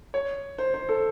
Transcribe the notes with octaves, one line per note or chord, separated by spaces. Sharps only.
C#5
C5
C5
A4